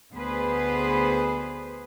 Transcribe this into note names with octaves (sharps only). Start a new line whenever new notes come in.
D2 B3 G#4 B4 C5